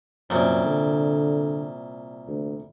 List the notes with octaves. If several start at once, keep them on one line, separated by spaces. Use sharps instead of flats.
C2 F#2 A#2
D3
D2